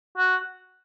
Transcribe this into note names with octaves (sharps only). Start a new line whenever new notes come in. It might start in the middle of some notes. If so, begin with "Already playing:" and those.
F#4